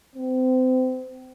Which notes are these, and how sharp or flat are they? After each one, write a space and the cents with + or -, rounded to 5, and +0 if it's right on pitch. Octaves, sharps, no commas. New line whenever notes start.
C4 -30